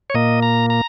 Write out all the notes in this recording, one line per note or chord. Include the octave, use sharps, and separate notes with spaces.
C#5
A#2 A#3 D#5
A#5
A#5